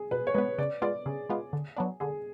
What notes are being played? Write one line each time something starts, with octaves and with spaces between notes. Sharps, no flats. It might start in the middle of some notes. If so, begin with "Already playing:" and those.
Already playing: G#4
B2 B4
C#5
G#3 B3 B4
C#3 D5
G#3 B3 F4 D5
C#3 G#4
G#3 B3 F4
D3
F#3 B3 D4
D3 G#4